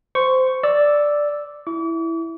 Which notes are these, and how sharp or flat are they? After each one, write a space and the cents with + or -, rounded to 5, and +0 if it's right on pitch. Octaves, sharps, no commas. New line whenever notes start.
C5 -15 C#6 +0
D5 +0 E6 +0
E4 +0 D6 -45